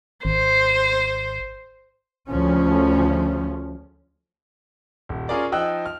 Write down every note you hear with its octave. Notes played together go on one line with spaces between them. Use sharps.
G#1 C5
D2 C#3 F3 A3 C#4
D#1
C#4 F4 G#4 A#4 D5
F3 D#4 D#5 G5 E6 F#6
F6